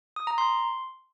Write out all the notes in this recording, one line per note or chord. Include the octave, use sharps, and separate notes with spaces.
D#6
A#5
C6